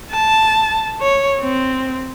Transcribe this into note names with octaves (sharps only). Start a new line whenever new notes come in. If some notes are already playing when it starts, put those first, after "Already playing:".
A5
C#5
C4